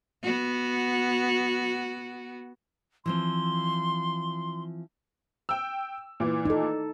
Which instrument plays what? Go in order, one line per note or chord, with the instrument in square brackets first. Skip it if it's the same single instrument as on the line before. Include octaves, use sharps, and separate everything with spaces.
[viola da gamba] B3 F#4
[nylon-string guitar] E3 F3 C4 [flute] C6
[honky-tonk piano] G5 E6
A#2 E3
[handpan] D#4 A4